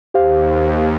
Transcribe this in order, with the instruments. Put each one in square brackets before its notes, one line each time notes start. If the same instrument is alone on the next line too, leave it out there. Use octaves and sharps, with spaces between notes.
[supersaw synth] D#2 [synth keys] G4 C5 F5